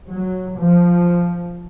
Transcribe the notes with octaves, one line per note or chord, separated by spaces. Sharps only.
F#3
F3